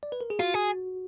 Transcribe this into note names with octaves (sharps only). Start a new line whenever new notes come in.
D5
B4
A#4
G#4
F4 F#4
G#4